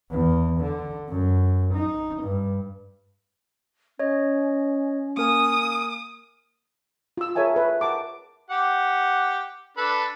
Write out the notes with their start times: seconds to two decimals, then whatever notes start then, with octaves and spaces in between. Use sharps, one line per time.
0.11 E2
0.61 D3
1.09 F#2
1.75 D#4
2.23 G2
3.99 C#4 C#5 D#5
5.17 A#3 A#4 G#5 D#6
7.17 F4 E6
7.35 G#4 A#4 C#5 E5 G#5 A5
7.54 A4 B4 E5
7.81 A#4 F#5 A5 D6
8.50 G4 F#5
9.77 D4 A4 B4